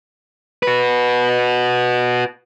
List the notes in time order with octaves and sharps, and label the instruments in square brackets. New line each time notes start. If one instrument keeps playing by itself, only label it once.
[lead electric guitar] F#4 B4